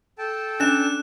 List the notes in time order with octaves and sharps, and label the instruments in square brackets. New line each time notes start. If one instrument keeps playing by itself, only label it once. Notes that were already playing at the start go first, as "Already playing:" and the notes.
[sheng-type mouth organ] A4 G5 A5
[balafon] C#4 [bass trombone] D4 [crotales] F#6 E7